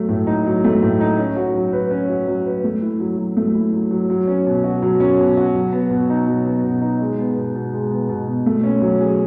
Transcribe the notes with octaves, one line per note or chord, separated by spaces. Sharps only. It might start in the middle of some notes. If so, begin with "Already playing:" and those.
Already playing: F#3 A3
A2
D#4
F#3
A3
A2
D#4
C#4
F#4
F#3
B4
C#4
F#4
F#3
B4
A3
E4
F#3
F#3
A3
E4
F#3
F#3
F#3
C#4
B2
F#4
F#3
C#4
B2
F#4
F#3
B3
B2
D#4
F#3
B3
B2
D#4
G#3
B3
B2
B2
G#3
B3
B2
B2
A3
C#4
F#3
G#4